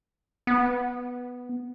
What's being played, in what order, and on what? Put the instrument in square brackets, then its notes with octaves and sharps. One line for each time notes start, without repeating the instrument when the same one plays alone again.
[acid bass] B3